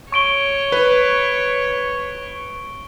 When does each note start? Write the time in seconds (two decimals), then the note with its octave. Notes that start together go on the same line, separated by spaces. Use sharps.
0.12 C#5 C#6 D7 G7
0.72 B4